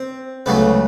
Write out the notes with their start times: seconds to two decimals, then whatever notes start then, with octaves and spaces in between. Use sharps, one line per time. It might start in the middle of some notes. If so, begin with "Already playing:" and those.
Already playing: C4
0.46 C#2 C#3 F#3 A3 B3